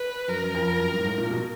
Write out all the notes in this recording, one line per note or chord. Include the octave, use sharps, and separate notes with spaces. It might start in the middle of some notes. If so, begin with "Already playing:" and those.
Already playing: B4
F#2 A#4
F#2
F2
F#2
G2
A2
G#2
A#2
B2